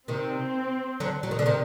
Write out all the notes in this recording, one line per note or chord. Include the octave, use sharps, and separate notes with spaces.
C3 D#3 C4
D3 F#3
F#3
D#3
D3
C3 D#3